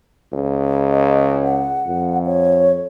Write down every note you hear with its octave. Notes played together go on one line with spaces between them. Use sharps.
C#2
D#5
F#5
F2
C#5